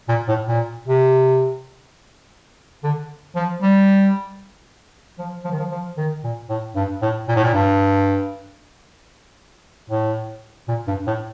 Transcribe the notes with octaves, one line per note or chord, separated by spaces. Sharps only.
A#2
A2
A#2
C3
D3
F3
G3
F3
F3
D#3
F3
F3
D#3
A#2
A2
G2
A2
A#2
A2
A#2
G2
A2
A#2
G2
A2